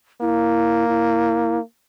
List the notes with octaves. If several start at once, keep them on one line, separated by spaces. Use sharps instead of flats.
A#3 E4
E4